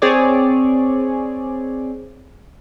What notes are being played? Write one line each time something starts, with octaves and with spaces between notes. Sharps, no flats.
C4 G#4 C#5 D5